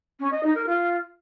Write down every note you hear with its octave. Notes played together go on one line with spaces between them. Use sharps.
C#4
D#5
D#4
A#4
F4